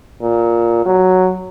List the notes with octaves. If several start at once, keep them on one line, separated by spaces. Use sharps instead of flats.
A#2
F#3